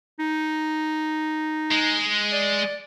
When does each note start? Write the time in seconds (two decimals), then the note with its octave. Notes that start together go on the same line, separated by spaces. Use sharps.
0.19 D#4
1.71 G#3
2.32 D5